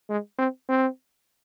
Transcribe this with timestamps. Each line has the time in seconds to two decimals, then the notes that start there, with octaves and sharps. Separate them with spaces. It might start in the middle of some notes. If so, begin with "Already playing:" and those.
0.09 G#3
0.38 C4
0.69 C4